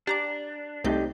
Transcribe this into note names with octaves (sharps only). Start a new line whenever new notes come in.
D4 G4 A#5 D6
C2 A3 C4 D#4 G4 G6